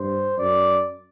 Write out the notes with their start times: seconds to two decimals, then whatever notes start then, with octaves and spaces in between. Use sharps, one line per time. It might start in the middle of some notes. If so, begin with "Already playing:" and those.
Already playing: G2 C5
0.38 F#2 D5